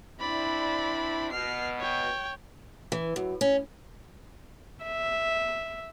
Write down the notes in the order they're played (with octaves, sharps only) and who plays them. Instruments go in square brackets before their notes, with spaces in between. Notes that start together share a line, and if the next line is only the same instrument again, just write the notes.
[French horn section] C4 D4 E4 [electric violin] D5 B5
[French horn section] B2 [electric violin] F6 C7
[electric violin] C#5 G5
[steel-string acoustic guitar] E3
F#2
C#4
[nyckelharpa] E5